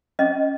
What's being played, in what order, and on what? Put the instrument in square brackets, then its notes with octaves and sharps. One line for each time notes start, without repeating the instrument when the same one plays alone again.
[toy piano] C#4 D#5